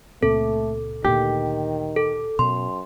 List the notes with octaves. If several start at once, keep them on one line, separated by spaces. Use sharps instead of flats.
C#2 A#2 A3 C4 A4
D2 A#2 D#3 G4
A4
F#2 B2 C6